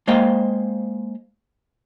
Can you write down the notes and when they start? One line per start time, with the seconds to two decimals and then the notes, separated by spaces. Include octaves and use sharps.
0.07 G#3 A#3 C5 D#5 F5 G5